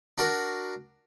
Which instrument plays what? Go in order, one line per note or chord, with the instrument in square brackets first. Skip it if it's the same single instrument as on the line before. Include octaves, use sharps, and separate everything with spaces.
[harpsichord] D4 F#4 A#4